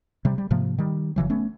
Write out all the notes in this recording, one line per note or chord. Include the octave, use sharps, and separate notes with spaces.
C3 G3
G3
G#2 C3 F3 A#3
D#3 G3
F#1 C#3 E3 F#3
A3 B3 C#4